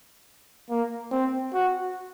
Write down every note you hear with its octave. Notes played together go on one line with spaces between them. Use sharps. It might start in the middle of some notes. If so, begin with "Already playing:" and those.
A#3
C4
F#4